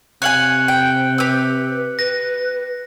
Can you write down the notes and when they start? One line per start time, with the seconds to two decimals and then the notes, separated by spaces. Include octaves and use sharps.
0.22 C3 C#5 F5 G#5 F#6 C#7 F#7
0.68 G5
1.18 G4 B4 E6
1.99 B4 A#6